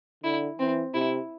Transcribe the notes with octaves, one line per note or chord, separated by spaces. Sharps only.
D3 E4
E3 C4
C3 E4